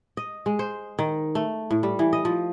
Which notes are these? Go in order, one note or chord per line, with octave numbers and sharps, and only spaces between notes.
D#5
G#3
C5
D#3
A3
A2
G3
E3
D#5
F3